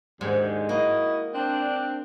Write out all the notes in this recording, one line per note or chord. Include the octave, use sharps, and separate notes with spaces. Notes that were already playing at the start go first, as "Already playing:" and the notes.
D#2 G#2 D3 G#3
A#3 E4 F#4 D#5
C4 D4